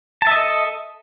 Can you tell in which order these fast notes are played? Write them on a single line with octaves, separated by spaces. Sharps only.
A5 E5 D#5 A4